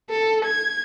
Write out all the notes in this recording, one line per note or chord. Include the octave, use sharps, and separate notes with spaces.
A4
G#6